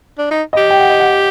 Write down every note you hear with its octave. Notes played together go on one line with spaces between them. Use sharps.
D4
D#4
G4 D#5
G5
F#5
D#5
F#5